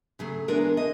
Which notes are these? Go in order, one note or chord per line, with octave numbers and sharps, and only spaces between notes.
C#3 F#3 A3 G#4
E3 G#3 B3 D4 A#4
D3 D#5